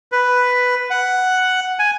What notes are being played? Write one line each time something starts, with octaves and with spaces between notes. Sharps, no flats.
B4
F#5
G#5